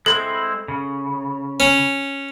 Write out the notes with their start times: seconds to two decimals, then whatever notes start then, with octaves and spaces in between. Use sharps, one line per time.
0.06 G#3 C4 E4 A4
0.68 C#3
1.60 C#4